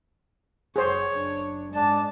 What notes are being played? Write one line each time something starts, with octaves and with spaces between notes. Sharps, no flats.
F#1 G#4 C5 C#5
F#1 D4
G#2 G#3 D4 A5